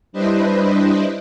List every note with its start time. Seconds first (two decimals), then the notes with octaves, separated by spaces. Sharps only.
0.13 G3 D4 E4 B4 C5 D#5